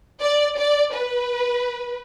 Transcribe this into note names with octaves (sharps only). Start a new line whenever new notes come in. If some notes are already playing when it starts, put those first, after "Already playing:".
D5
D5
B4